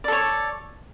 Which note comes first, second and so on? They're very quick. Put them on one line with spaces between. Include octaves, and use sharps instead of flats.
D5 A4 C#5